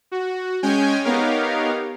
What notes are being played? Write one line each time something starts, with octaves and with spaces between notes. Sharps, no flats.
F#4
G#3 C#4 C#5 G5 G#5
B3 D#4 G4 A#4 C#5 F5